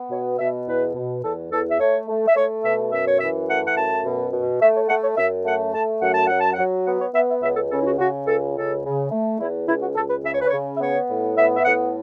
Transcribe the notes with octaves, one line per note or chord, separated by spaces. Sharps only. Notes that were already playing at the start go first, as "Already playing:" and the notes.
Already playing: B3
B2 C#5
B2 E5
E2 B4
B2
E2 A4
E2 A4
E5
A3 C#5
A3
E5
A3 C#5
B2 E5
F#2 E5
C#5
E3 E5
A3 F#5
F#5
F#2 A5
B2
B2
A3 E5
C#5
A3 F#5
C#5
F#2 E5
A3 F#5
A3 A5
F#2 F#5
A5
F#3 F#5
A5
F#3 F#5
B3 F#5
C#5
B3 E5
E5
C#2 E5
A4
C#3 A4
E4
F#4
C#3 F#4
C#2 A4
C#3 A4
C#3
A3
E2 E4
C#2 E4
F#4
C#2 A4
B4
C#3 E5
C#5
B4
C#3 C#5
E5
B3 C#5
A2
B3 E5
E5
A2 F#5